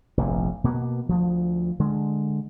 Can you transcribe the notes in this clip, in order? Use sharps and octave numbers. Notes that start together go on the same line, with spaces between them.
F1 A#1 G#2
B2 A#3 B3
D2 F3
D3 G#3